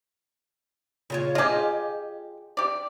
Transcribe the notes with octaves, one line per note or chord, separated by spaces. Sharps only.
C#3 F4 C#5
F4 G4 G#4 D#5
G4 D5